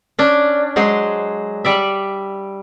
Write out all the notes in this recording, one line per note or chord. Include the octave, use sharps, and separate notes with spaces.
C#4 D4
F#3 G#3 C5
G3 D5 E5